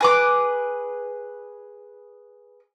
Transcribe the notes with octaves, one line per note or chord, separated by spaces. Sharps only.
G#4 B4 D6